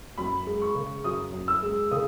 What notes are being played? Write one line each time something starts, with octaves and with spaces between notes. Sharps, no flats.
F#2 B5
G#3
C#6
C#3
F#2 D#6
F#2
E6
G#3
C#3 D#6